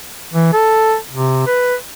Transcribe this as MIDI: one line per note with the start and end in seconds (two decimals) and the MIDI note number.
0.34 0.49 52
0.53 0.96 69
1.10 1.47 48
1.47 1.75 71